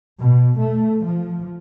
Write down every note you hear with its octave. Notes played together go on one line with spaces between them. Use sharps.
B2
A3
F3